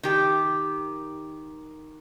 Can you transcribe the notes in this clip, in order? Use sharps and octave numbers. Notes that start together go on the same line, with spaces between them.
D#3 G4